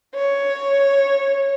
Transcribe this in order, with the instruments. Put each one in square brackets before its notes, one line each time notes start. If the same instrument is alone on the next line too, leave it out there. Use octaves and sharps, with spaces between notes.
[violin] C#5